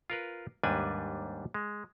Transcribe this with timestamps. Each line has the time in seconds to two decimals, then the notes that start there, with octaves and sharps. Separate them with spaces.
0.10 F4 A#4 B4
0.63 D#2 G#2 G3 D4 B4 G#5
1.54 G#3